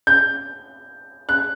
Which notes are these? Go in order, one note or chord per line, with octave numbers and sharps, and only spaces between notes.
G6
F#6